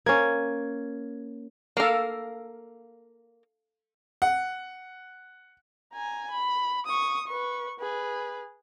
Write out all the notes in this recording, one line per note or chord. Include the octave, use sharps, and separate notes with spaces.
A#3 C#4 G#6
A#3 A4 A#4 F5
F#5
G#5 A#5
B5
C#6 D#6
B4 C#6
G#4 B4